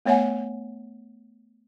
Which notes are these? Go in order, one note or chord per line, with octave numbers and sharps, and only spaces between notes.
A3 B3 C#5 E5 F#5 G#5